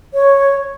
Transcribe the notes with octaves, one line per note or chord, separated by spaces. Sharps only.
C#5